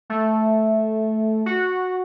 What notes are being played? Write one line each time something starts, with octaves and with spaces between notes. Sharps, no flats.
A3
F#4